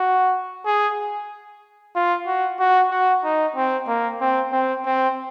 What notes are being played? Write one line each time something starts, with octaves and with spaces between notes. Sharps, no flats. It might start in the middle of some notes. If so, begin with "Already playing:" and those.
Already playing: F#4
G#4
F4
F#4
F#4
F#4
D#4
C4
A#3
C4
C4
C4